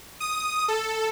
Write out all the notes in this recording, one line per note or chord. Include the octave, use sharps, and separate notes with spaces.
D#6
A4